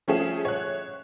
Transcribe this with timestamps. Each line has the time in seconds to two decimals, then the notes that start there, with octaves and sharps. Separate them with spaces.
0.08 F3 A3 C#4 E4 G#4 E7
0.45 C#5 F#6